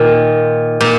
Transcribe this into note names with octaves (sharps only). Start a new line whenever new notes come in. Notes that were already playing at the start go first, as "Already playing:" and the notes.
Already playing: A#2 D#3
A#2